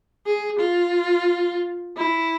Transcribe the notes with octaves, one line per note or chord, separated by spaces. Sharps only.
G#4
F4
E4